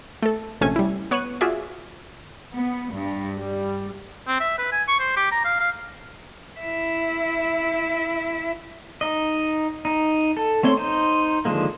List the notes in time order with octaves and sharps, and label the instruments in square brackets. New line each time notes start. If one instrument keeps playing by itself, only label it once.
[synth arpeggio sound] A3 A4
A#1 C3 A3 C#4 G#5
G3 E4
B3 C#5 C#6 F#6 D#7
F4 F#4 G#4 D5 E5
[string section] B3
G2
G3
[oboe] C4
E5
B4
G#5
C#6
C5
G4
A#5
F5
F5
[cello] E4 E5
[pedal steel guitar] D#4 D#5
D#4
A4
A3 C4 C#5 C6
D#4 C5
D3 D#3 F3 G#3 A#3